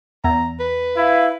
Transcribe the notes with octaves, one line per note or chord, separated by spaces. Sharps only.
E2 A#5
B4
E4 F5